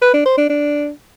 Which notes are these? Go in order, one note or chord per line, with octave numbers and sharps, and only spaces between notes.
B4
D4
C5
D4
D4